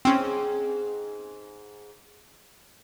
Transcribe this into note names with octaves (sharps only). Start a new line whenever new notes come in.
G#2 C4 C#4 G#4